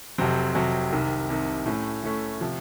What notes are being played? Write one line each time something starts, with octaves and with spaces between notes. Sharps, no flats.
F1 F2 C3 F#3 C4
F1 F2 C3 F#3 C4
C2 C3 D#3
C2 C3 D#3
A2 A3 C#4
A2 A3 C#4
C3 F3